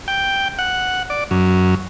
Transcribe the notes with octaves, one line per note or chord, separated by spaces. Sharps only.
G5
F#5
D5
F#2